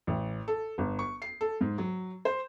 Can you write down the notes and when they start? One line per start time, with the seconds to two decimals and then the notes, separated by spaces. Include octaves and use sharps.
0.07 A1
0.48 A4
0.78 G1
0.99 C#6
1.22 C7
1.41 A4
1.61 G#2
1.78 F#3
2.25 C5